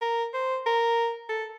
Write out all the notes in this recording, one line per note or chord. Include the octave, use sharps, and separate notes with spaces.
A#4
C5
A#4
A4